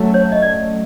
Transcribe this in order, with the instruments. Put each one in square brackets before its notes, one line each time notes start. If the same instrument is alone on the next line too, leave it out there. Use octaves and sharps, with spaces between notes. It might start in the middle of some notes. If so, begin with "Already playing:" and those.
Already playing: [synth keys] F#3 A3 C#4
[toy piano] C#5
D#5
D5